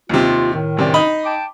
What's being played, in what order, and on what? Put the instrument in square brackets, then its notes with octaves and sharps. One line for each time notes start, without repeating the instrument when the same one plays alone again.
[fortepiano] D#2 C3 [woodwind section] F4
[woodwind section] A2 D#3
[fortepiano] C#2 C3 D5
D#4 D#5 B5
[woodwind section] G5 A5 D6